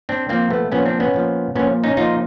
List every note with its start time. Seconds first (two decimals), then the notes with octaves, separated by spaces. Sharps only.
0.09 C4 D4
0.29 A#2 F3 A#3 C4
0.50 A3 B3
0.72 A#2 F3 B3 C#4
0.86 C4 D4
1.00 B3 C#4
1.14 A#2 F3
1.55 A#2 F3 B3 C#4
1.84 C#4 D#4
1.97 A#2 F3 D#4 F4